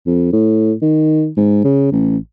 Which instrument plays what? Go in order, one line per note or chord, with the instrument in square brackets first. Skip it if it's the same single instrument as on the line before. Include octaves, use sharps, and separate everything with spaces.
[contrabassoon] F2
A2
D#3
G#2
C#3
A1